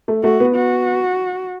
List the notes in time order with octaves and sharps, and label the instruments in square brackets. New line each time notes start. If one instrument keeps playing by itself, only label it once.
[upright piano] A3
[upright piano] A3 [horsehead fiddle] F#4
[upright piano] B3
[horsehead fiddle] F#4